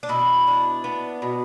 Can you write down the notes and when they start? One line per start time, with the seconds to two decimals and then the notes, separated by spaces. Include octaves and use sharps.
0.03 D4
0.09 B2 E4
0.47 D4
0.84 B3
1.22 B2